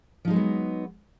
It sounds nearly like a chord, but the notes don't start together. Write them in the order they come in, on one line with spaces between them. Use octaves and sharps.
F3 D#4 G#3 F#3 B3